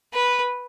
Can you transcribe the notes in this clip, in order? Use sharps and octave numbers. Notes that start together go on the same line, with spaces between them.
B4